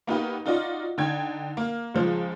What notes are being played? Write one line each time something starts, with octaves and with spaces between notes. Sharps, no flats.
A#3 B3 D#4 F#4 G4 B4
D#4 F4 F#4 D5 D#5
D3 D#4 G5 G#6
A#3
C#2 F3 G#3